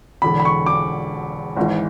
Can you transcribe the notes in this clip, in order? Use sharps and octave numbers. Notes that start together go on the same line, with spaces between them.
E1 E2 D3 B5
B5
C#6
D6
G#1 G#2 E3